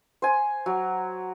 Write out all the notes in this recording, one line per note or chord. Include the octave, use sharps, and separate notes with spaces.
C5 G#5
F#3